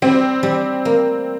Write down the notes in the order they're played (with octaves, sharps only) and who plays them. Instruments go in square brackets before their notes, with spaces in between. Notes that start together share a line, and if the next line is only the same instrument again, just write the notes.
[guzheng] G3 [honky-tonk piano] C4
[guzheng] G3
A#3